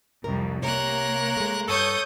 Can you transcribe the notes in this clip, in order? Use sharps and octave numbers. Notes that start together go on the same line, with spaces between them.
C2 F2 A#4
C3 A#3 A#4 C#5 F#6
G#3 A3
G2 A4 C#5 A5 C#6 D#6 G6